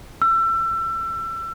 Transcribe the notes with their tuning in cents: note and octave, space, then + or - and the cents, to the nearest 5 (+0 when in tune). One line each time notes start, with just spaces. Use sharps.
E6 +30